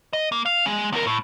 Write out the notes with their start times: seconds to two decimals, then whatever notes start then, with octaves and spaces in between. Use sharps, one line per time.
0.13 D#5
0.32 A#3
0.46 F5
0.66 G#3
0.93 E2 A#4
1.07 A2